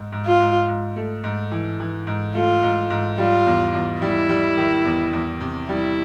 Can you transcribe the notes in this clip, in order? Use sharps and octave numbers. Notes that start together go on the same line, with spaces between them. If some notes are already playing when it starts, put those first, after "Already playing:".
Already playing: G#2
G#2
F4
G#2
G#2
A3
G#2
E3
E3
G#2
A3 F4
G#2
G#2
G3 F4
E2
E2
G3 E4
G3
D#3
E2
E2
C3
G3 E4